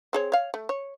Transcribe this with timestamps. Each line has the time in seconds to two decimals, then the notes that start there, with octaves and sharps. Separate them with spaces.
0.13 C4 G#4 C#5
0.32 C#5 F5
0.54 A3
0.69 C#5